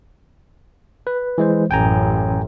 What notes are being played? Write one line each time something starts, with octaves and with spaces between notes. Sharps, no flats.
B4
E3 G#3 C5
A1 F#2 G5 G#5 A#5